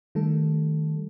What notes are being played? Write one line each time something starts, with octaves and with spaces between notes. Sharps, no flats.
D#3 G3 A3 A4